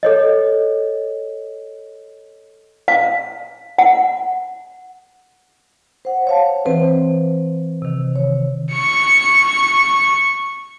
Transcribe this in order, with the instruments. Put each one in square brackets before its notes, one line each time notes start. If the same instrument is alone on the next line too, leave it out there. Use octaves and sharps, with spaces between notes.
[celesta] A4 C#5 D#5
[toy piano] F5
F#5
[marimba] C5 F#5
C#5 F5 A5
E3 C4 B4 C5
C3 D#3
C#5
[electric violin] C#6 C#7